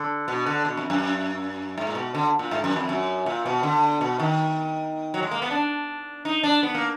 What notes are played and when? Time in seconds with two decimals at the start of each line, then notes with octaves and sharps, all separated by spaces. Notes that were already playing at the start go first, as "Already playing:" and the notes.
Already playing: D3
0.28 B2
0.46 D3
0.65 B2
0.77 F2
0.90 F#2
1.78 G#2
1.87 A#2
1.95 B2
2.14 D3
2.39 A#2
2.51 G#2
2.64 F#2
2.76 F2
2.89 F#2
3.26 A#2
3.46 B2
3.63 D3
4.01 B2
4.20 D#3
5.14 F#3
5.22 G#3
5.31 A#3
5.42 B3
5.51 D4
6.25 D#4
6.43 D4
6.63 B3
6.75 A#3